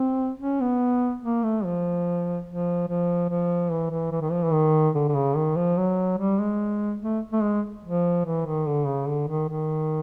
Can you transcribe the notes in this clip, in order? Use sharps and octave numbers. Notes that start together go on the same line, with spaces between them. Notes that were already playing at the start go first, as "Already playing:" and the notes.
Already playing: C4
C#4
B3
A#3
A3
F3
F3
F3
F3
E3
E3
E3
D#3
F3
E3
D#3
D3
D3
C#3
D#3
F3
F#3
G3
G#3
A3
A3
G#3
F3
E3
D#3
D3
C#3
D3
D#3
D#3